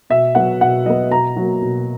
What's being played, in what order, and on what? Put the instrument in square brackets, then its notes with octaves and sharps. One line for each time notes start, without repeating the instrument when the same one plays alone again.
[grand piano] B2 E5
F#3 B3 F#5
B2 F#5
F#3 B3 D#5
B2 A#5
F#3 A#3
B2